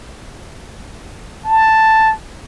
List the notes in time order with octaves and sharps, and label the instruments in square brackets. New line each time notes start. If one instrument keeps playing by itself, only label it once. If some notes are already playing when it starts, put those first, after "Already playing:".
[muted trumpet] A5